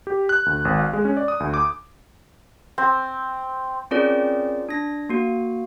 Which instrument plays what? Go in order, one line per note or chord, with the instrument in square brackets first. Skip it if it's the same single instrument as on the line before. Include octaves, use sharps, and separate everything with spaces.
[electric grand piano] G4
F#6
D2
G#1
F5
G#3
C#4
D5
D#6
D2
D6
[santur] C4
[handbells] C4 C#4 F4 G#4 A#4 D5
D4 A#6
A#3 F#4